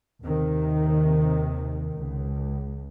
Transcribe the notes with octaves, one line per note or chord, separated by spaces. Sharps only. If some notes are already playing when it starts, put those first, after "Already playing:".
D#2 C3 D#3
C#2